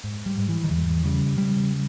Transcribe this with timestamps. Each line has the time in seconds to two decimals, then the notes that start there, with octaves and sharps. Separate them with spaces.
0.04 G#2
0.26 G3
0.38 G#2
0.49 E3
0.64 D#3
0.70 E2 E3
1.04 C#3 G3
1.37 C#3 G3